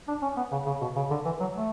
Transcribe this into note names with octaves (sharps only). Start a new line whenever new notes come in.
D4
C#4
B3
C#3
C#3
B2
C#3
D3
E3
F#3
A3